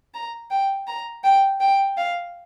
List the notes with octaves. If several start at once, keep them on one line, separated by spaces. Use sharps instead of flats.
A#5
G5
A#5
G5
G5
F5